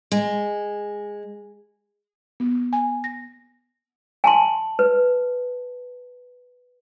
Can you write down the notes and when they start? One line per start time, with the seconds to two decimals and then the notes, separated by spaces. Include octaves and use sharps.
0.12 G#3
2.40 B3
2.73 G#5
3.04 A#6
4.24 G#5 A5 C6
4.79 B4